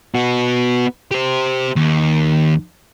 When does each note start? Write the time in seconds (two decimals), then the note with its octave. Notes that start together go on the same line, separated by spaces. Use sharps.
0.15 B3 F#4
1.11 G4 C5
1.76 D#2